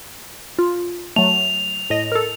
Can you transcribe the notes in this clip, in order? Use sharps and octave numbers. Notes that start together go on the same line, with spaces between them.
F4
F#3 A3 F7
A2 D#5 A#6
A4 A#4